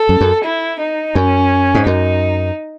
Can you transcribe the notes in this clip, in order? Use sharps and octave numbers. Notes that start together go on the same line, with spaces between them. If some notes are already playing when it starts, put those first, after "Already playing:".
Already playing: A4
F#2
F#2
E4
D#4
F#2 C#4
G#2
F#2 D#4